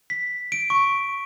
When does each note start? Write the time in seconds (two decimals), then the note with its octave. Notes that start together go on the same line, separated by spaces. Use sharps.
0.10 B6
0.52 D7
0.70 C#6